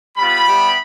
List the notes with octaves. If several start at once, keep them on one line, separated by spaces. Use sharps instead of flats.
G3 B3 F4 B5
G3 B3 E4 G4